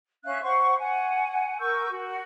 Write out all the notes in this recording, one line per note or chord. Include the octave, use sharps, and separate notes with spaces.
C#4 E5 F5 F#6
C5 F#5 C6 C#6
F#5 G#5
A#4 C#6 E6 G6
F#4